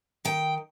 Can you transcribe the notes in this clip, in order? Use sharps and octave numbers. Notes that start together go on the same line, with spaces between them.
D#3 G5